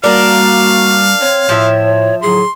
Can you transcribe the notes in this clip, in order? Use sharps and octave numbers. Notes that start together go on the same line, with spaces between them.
G3 A#3 D4 F#4 A#4 F5
C4 C#5
A2 F3 E5
A2 D3 F#3 G#4 C6